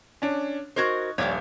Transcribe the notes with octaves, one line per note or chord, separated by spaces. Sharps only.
C#4 D4
D#4 F#4 A#4 C5 G#6
D#1 A#1 C#5 D5 G5